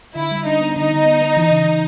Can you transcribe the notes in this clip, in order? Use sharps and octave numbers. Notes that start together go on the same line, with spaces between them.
D3 E4
G3
D4 D#4
B3
D3 D#4
D3
B3
B3
E3
C#3
C#3